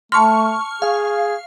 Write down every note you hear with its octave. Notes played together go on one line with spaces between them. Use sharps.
A3 A5 C6 C#6 F6
G#4 F5